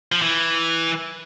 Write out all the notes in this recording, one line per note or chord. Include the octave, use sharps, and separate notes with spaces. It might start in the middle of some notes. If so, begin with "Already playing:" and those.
F3
E3